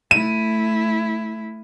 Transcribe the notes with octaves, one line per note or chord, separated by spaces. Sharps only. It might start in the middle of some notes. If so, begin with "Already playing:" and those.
A3 E4 D#7